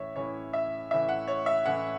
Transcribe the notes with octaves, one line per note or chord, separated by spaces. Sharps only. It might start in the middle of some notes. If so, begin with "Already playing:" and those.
Already playing: A2 E3 C#4 E4 C#5 E5
A2 E3 C#4 E4 C#5
E5
A2 E3 C#4 E4 E5
F#5
C#5
E5
A2 E3 C#4 E4 F#5